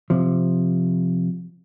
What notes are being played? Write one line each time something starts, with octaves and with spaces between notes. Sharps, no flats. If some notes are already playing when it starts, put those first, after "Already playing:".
C3 F3